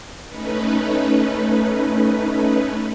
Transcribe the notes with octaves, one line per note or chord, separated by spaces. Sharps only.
A3 C#4 D#4 B4